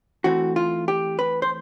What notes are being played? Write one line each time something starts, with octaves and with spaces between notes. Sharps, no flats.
E3 A3 C4 F#4
F4
G4
B4
C5